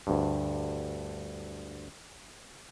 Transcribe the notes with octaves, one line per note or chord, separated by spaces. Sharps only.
D2 G2